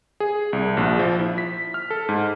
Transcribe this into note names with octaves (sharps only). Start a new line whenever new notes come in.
G#4
C2
A#1
F3
E4
B6
F6
A4
G#2